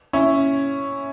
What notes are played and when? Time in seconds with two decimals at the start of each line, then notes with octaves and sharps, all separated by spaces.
0.13 C#4 E4